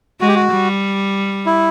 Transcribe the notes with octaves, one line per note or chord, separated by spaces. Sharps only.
G#3 F#4
G4
F#4
G3
E4